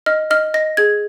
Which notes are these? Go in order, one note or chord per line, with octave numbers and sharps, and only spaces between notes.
D#5 F6
D#5 F6
D#5 A#6
G#4 G#6